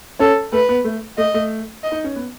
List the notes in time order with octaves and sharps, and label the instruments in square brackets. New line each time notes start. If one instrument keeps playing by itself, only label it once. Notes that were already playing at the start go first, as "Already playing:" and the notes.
[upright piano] C#4 C#5 [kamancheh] A4
[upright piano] A3 A4 [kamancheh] B4
[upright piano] B3
A3
[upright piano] A3 [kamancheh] D#5
[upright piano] A3
[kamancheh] D#5
[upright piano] D#4
C#4
B3